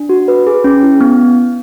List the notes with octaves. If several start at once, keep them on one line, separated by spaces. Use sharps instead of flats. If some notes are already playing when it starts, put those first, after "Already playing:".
Already playing: D4
F#4
B4
G#4
C#4
E4
B3